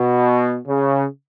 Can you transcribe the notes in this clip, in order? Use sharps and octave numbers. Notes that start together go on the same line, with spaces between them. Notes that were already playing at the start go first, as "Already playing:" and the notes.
Already playing: B2
C#3